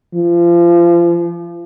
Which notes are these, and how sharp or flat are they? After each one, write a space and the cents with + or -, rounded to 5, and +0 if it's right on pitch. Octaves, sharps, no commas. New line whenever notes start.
F3 -30